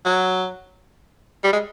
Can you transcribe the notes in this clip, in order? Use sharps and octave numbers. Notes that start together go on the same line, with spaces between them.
F#3
G3
G#3